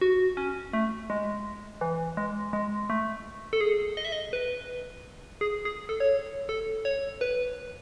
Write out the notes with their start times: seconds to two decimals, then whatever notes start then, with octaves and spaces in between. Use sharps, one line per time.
0.01 F#4
0.37 C#4
0.73 A3
1.10 G#3
1.81 E3
2.17 G#3
2.53 G#3
2.90 A3
3.53 A4
3.61 G#4
3.97 D#5
4.05 E5
4.12 D#5
4.33 B4
5.41 G#4
5.65 G#4
5.89 A4
6.00 C#5
6.49 A4
6.85 C#5
7.21 B4